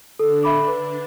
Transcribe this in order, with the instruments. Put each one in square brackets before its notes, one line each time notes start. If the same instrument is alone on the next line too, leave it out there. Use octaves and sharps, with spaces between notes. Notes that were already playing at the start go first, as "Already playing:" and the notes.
[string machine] D3 D4 [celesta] A4
[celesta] E5 B5 D6
[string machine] D3 D4 [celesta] B4